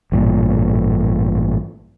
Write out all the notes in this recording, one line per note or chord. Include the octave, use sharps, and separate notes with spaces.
A1 G2 A#2